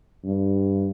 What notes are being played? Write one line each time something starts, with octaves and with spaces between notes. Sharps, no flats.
G2